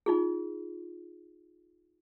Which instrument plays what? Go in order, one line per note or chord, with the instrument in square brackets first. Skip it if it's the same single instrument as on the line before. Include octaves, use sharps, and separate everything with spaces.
[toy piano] D#4 F4 G#4